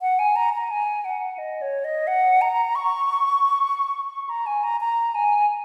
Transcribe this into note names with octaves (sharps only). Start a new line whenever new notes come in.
F#5
G#5
A#5
A#5
G#5
F#5
D#5
C#5
D#5
F#5
A#5
C#6
C#6
A#5
G#5
A#5
A#5
G#5